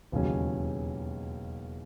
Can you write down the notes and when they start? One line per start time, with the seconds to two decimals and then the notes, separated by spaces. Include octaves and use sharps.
0.12 E1 D#2 C#3 F#3 C#4